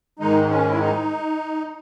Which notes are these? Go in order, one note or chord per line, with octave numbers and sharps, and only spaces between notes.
G#2 D#3 G#3 D#4
C#4
E4
D#4